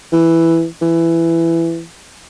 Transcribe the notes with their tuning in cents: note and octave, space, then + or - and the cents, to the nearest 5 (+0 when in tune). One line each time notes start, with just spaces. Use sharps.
E3 +5
E3 +15